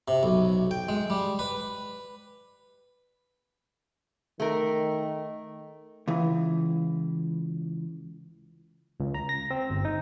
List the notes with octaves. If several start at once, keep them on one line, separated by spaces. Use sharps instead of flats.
C3
B1
G5
G#3
G3
B4
D#3 A3 A#4
C#2 E3
C#2
A#5
A#6
C4
G1
D#4